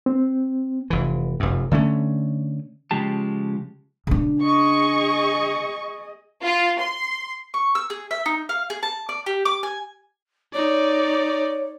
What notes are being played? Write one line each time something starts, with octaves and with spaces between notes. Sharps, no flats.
C4
F1 E3
F1 F#2
D3 A3 C#4
C#3 F3 G#3 G4 A5
C#3 D4
G#4 D#5 C#6
F4
C6
C#6
E6
G#4
E5
D#4
F5
G#4
A5
D5
G4
D6
G#5
D#4 C#5 D5